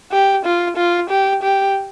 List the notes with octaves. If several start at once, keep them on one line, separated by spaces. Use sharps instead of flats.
G4
F4
F4
G4
G4